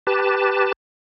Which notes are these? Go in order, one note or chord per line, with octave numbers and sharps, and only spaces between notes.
G4 B4 A5